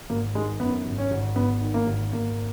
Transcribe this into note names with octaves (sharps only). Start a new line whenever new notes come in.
G#1 A#3
D#3 G#3
F#2 B3
G#1
C#4
G#1
G#1 B3
D#3
A#3
G#1
G#1 A#3